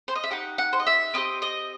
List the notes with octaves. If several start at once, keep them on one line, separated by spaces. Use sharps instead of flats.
C5
D#5
E5
D#4 G4 F#5
F#5
C5
D#5
E5
C4 E4 G4 D#5
D#5